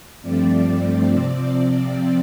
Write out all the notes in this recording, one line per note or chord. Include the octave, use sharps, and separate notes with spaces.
G2 F3 A3 C4 D5
C3 F3 C4